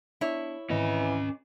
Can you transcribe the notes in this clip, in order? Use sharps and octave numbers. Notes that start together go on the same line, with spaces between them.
B3 D4 E4 C#5
G#2 D#3 E3 C4 C#4 D#5